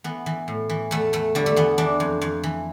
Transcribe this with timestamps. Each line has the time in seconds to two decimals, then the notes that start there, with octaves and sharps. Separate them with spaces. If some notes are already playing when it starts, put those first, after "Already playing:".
0.04 E3 B3
0.26 E3
0.48 A2
0.70 E3
0.91 E2 A3
1.13 E2 A3
1.35 D3 G3
1.46 A3
1.56 E2 B3
1.78 E3 D4
2.00 F2
2.21 F2
2.44 E3